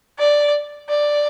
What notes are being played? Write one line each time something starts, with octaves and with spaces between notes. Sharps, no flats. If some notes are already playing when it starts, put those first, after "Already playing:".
D5
D5